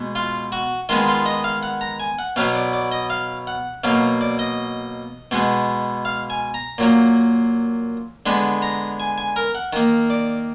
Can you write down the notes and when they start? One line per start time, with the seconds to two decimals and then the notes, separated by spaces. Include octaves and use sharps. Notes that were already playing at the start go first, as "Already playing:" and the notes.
Already playing: B2 G#3 B3
0.15 F4
0.52 F#4
0.89 D#3 G#3 B3 F4
1.08 F4
1.26 D#5
1.44 F5
1.63 F#5
1.81 A#5
2.00 G#5
2.19 F#5
2.36 B2 F#3 B3 F5
2.55 D5
2.73 D5
2.92 D#5
3.10 F5
3.47 F#5
3.84 B2 F#3 A#3 F5
4.21 D5
4.39 D#5
5.31 B2 G#3 B3
6.05 F5
6.30 G#5
6.54 A#5
6.78 A#2 F#3 A#3
8.26 D3 G#3 B3 B5
8.62 A#5
9.00 G#5
9.18 G#5
9.36 A#4
9.55 F#5
9.73 D#3 A#3
10.10 D5